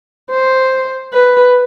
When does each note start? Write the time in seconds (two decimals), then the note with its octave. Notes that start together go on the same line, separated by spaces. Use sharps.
0.30 C5
1.13 B4